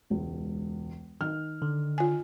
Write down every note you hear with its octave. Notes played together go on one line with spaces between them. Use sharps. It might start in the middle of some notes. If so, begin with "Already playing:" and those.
E1 C#2
D#3 F6
D3
F4 G#5